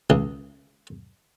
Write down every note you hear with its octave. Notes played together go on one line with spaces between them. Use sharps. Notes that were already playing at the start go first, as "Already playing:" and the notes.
C#2